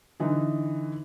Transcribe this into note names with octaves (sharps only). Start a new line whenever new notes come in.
D3 E3 D#4